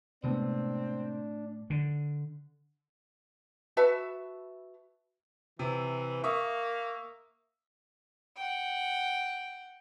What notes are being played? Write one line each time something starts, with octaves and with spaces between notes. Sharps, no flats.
A2 C3 G#3 B3 C4 D4
D3
F#4 B4 E5 A5
C3 E3
A#3 E5 C#6 D#6
F#5 G5